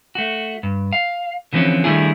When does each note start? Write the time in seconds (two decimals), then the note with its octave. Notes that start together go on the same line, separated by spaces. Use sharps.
0.15 A3 F#4
0.63 G2
0.93 F5
1.53 D3 E3 F3 C4 C#4
1.84 D#3 G3 A3 D4 E4 G#4